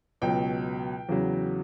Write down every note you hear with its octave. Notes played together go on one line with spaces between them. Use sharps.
C#2 B2 F#3 G5
E2 C#3 F#3